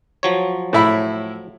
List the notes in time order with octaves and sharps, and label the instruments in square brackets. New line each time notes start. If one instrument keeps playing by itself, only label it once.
[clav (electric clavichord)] F3 F#3 C#5
[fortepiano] A2 E4 B5